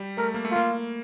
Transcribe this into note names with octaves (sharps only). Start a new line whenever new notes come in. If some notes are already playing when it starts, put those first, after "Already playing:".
Already playing: G3
A3 A#4
A#3
A3
A#3 F4